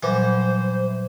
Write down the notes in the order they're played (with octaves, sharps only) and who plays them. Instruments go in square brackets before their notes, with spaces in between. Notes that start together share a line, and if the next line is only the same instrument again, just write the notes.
[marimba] A#2 F#3 G3 [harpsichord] E3 [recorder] C5